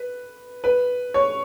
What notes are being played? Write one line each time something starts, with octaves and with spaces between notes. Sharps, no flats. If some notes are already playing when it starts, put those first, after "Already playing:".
Already playing: B4
B4
C#5